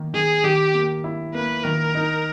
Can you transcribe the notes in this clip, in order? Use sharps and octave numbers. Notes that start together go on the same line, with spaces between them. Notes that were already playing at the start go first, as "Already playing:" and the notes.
Already playing: D#3 A#3
D#3 G#4
D#3 G4
A#3
E4
A#3 B4
D#3 A#4
D#4